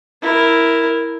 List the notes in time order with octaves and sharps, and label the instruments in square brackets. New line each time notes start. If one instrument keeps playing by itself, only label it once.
[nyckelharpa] E4 A#4